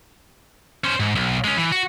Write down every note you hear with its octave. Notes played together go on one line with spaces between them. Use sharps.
C#4 C5
G#2
B1
G#3 C#4
E3
F#4